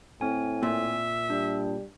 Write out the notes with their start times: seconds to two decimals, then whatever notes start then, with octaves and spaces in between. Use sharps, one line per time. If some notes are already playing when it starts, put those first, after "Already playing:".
0.21 A2 C4 G#5
0.63 A#2 E5
1.30 G3 D4